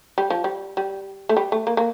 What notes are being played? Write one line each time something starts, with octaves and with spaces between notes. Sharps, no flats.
G3
F3
G3
G3
A3
G3
A3
A#3
A#3